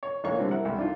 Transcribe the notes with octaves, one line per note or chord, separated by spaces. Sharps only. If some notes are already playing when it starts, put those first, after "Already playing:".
C#5
A#1 A#3 C#5 C#6
D3 G3 C4 D4
E4 A#4 F#5
C2
D4 D#4 F4